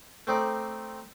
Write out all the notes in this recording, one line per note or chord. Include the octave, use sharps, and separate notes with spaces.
A3 C4 D#4 D5